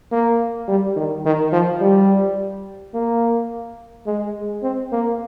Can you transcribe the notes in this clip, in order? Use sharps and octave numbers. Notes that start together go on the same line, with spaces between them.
A#3
G3
D#3
D#3
F3
G3
A#3
G#3
C4
A#3